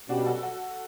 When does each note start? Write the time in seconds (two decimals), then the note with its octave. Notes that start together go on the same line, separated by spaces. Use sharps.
0.09 B2 G3 C#4 D4 F#4
0.26 F#4 A4
0.42 F#4 A4